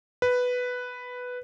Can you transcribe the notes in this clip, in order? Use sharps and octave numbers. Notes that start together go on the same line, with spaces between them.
B4